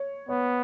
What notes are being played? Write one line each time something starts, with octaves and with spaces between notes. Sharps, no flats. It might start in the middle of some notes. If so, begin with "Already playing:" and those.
Already playing: C#5
B3 C#5